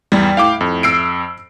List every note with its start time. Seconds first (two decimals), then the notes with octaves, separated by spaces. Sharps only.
0.12 E2 G3
0.37 A2 F5 G5 D6
0.61 F2
0.83 E6 C7 D7